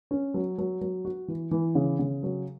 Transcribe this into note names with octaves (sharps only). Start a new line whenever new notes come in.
C#4
F#3
F#3
F#3
F#4
E3
E3
C#3
C#3
F#3